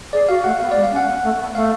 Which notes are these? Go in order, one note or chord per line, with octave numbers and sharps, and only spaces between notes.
G#4 D5
F#4 F5
A3 F#5
B3 F5
D5
G#3
F5
C#4
F#5
B3
A3
B3
A3 F5